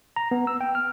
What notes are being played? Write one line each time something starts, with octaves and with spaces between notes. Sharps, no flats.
A#5
B3
E6
G5
F6